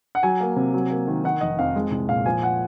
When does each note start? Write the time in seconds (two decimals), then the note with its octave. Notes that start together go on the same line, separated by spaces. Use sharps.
0.15 F#5
0.23 F#3 G#5
0.41 A#3
0.56 C3
0.74 F#3
0.90 A#3
1.07 D#3
1.24 D#3 F#5
1.41 F1 D#5
1.59 F2 F5
1.76 G#3
1.92 C2
2.08 A#2 F5
2.26 F3 G#5
2.43 F#5